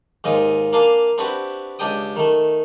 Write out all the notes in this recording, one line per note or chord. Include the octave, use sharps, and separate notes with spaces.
D#2 G#2 F4 D#5 G#5
A#3 D4 F5 G#5 C6
C4 D4 E4 F#4 G4 B4
C#2 D4 G4 G5 D#6
D#3 A3